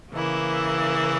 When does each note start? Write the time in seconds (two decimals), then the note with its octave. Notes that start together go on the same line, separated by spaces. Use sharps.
0.12 C#3 E3 A#3 E4